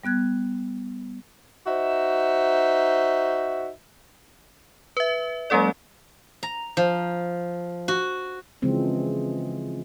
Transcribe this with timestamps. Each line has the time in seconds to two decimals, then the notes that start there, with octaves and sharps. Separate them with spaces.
0.04 G3 B3 F#6 G#6
1.67 D#4 F#4 C5 E5
4.97 B4 E5
5.50 F#3 G#3 A#3 C#4 A4 D5
6.43 A#5
6.77 F3
7.88 F#4
8.62 C#3 E3 F3 G#3 C4